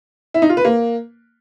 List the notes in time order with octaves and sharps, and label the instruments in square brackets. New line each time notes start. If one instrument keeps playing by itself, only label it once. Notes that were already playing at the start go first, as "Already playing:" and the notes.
[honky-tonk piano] E4
D#4
F4
B4
A#3